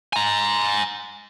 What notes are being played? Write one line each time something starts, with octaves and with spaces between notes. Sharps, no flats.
G#5 A#5